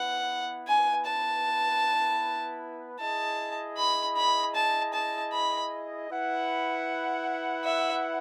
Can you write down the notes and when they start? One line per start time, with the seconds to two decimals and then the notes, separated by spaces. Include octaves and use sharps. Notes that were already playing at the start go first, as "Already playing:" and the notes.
Already playing: B3 E4 B4 F#5
0.67 G#5
1.06 A5
2.99 E4 G#4 D#5 A5
3.77 B5
4.17 B5
4.55 A5
4.93 A5
5.32 B5
6.10 E4 B4 F#5
7.65 E5